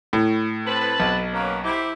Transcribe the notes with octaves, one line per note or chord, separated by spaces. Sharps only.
A2
C4 B4 A5
B1
A#3 C#4 B4
E4 G4 C5